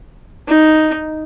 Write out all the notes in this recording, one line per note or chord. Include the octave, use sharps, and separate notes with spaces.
D#4